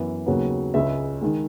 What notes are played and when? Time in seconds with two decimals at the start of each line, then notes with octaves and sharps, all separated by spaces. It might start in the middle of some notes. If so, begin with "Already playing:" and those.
Already playing: F#2 E3 B3
0.26 D#2 C#3 F#3 B3
0.74 C#2 C#3 G#3 E5
1.21 D#3 G#3